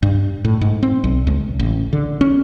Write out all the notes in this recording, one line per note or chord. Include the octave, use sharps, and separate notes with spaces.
G2
A2
G#2
C4
B1
C#2
A1
D3
C#4